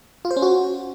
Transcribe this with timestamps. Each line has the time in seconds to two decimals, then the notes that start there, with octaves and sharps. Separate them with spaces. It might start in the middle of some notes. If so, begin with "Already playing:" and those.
0.25 F4
0.31 C5
0.37 C#4
0.42 F#4